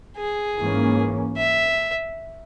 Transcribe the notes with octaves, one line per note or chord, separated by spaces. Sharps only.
G#4
G#2 E3 A#3 C#4
E5